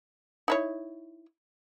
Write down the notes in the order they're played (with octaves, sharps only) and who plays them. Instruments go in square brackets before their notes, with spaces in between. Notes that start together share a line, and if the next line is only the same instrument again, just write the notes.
[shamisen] D#4 E4 C#5